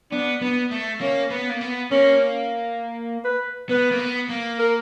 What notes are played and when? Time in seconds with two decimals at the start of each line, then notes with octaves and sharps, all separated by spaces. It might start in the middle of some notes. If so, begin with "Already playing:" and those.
0.12 B3 D4
0.41 B3
0.71 A3
1.01 A#3 C#4
1.30 B3
1.49 A#3
1.61 B3
1.91 A#3 C#4
3.24 B4
3.69 B3 B4
3.92 A#3
3.99 B3
4.30 A#3
4.59 A#4